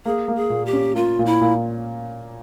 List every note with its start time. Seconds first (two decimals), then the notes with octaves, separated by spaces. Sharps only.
0.05 A#3 G#4
0.28 A#3
0.36 G#4
0.50 A#2
0.66 G4
0.73 C#4
0.95 A#3 F4
1.19 A#2
1.26 E4
1.41 A#2